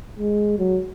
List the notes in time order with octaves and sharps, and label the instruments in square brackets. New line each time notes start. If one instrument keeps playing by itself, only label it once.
[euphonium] G#3
F#3